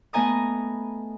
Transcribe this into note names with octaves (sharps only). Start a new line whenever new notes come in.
A3 B3 D#5 G#5 A#5 D#6